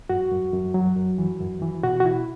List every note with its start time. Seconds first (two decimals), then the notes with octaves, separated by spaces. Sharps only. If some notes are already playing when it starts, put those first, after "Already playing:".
0.09 F#2 F#4
0.31 F#2
0.53 F#2
0.74 F#3
0.97 F#2
1.18 E3
1.40 F#2
1.62 E3
1.83 B2 F#4
2.00 F#4
2.05 B2 E4